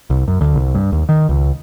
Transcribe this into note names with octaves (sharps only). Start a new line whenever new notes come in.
C2
F#2
D2
C2
G2
D#2
D#3
C#2